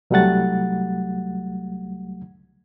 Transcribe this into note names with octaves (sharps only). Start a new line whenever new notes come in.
C2 F#3 G3 A3 F#5 A6